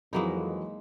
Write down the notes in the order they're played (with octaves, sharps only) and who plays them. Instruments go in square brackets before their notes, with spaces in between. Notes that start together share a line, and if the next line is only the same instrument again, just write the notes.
[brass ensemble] F2 [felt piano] E3 F#3 B5 [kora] G#3 A#3 D#4